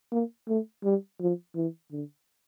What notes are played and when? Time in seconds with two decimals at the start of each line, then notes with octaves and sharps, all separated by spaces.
0.12 A#3
0.48 A3
0.84 G3
1.21 F3
1.56 E3
1.92 D3